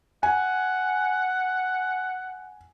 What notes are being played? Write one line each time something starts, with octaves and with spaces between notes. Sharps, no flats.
F#5 G#5